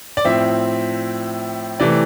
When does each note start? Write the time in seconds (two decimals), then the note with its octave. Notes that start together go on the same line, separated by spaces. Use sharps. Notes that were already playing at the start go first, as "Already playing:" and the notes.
0.17 D5
0.25 A2 F3 C4 E5
1.80 C3 E3 A3 D5